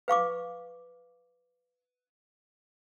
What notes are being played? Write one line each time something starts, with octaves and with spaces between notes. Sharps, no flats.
B4 F5 C#6 D6